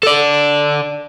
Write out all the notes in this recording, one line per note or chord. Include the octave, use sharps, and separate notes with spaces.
A4 D5